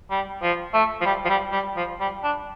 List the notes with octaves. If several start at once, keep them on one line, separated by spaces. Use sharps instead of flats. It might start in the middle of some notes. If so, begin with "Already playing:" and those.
G3
F3
A3
F3
G3
F3
G3
G3
F3
G3
D4